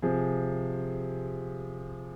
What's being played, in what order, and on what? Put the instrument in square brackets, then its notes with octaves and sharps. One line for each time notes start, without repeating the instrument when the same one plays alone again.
[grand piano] C3 F3 G#4